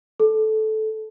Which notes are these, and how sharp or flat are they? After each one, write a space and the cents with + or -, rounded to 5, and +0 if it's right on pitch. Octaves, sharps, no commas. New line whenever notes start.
A4 -15